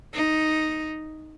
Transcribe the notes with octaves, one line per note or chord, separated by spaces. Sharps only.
D#4